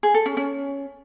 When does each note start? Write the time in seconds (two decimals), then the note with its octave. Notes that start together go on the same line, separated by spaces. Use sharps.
0.03 G#4
0.14 A4
0.26 C#4
0.37 C#4